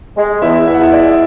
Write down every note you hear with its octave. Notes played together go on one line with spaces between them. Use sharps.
G#3
E2 E4 E5
E2 E5
F#5
E4 E5
G#3 D5